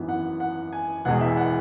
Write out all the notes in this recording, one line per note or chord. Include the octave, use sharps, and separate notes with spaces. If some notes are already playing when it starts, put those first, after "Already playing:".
Already playing: G#1 F#2 E3 B3
F#5
F#5
G#5
E1 E2 B2 G#3 F#5
E5
F#5